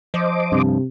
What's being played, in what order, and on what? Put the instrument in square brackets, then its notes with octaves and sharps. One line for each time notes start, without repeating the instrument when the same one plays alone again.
[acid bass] F3 [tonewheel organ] C5 D#5 D6
[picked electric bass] G2 [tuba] C3